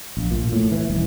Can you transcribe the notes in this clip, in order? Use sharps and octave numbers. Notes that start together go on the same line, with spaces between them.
A#1
A#2
A2
E3
D#1